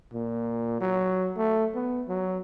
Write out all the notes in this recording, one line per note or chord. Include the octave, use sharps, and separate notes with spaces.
A#2
F#3
A3
B3
F#3